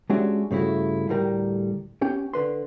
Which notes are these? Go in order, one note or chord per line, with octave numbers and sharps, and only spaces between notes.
G#3 C#4 D4 F#4 G4 E5
G2 C#3 A3 E4 F#4
D2 A2 G3 A#4 A#5
B3 C#4 G4 G5
D3 B4 C6